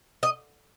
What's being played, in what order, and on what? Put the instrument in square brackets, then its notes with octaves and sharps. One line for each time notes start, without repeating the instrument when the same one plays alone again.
[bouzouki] D#5